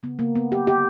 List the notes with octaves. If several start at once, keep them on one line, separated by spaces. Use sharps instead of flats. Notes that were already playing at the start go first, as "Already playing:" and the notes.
C#3 B3
C#3 A#3
C#3 B3
F#3 G4
D3 G4